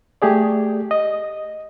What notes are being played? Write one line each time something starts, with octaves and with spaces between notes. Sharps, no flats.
A3 G4 G#4 D5
D#5